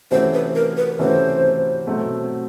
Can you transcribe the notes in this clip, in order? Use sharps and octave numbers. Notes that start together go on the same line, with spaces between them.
C3 E3 A3 C#4 F#4 C5
B4
A#4
B4
C3 E3 A3 C#4 F#4 C5
B2 F#3 A3 C4